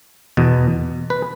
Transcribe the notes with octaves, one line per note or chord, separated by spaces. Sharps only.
E2 B2
B4